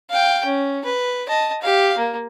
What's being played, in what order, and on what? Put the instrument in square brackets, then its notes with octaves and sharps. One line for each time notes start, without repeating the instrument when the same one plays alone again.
[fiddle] F5 G5
C#4
B4
D#5 A5
G4 F5
A#3